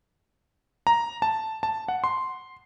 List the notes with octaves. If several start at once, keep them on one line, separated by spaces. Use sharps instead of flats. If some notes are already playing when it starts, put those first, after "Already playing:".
A#5
A5
A5
F#5
C6